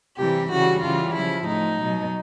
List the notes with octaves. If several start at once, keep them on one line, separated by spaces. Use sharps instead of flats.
C3 E3 G3 G4
C#3 E3 G3 F#4
C#3 E3 G3 F4
C#3 F3 E4
A2 F3 D#4
B2 F#3